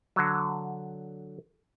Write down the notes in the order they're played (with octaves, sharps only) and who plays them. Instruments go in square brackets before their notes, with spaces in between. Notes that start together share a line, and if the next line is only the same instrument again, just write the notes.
[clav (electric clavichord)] D3 F#3